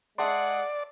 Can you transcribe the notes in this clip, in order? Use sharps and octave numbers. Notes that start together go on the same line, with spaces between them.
G#3 G#4 D5 E5 F#5 A5 C6